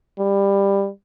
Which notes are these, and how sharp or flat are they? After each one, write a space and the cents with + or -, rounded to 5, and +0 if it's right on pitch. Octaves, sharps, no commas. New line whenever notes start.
G3 +15